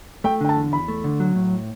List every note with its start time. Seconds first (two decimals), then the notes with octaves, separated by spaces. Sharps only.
0.24 A3 G5
0.41 D3 G5
0.49 A5
0.56 E2
0.72 E2 B5
0.88 A3
1.04 D3
1.20 F#3
1.35 A2